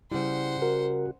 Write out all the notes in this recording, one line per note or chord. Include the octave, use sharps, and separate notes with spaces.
C#3 G3 E4 C5 F#5
F#4 A#4